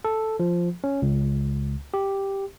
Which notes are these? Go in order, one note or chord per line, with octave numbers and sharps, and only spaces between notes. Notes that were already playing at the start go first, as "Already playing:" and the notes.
A4
F3
C#4
C#2
G4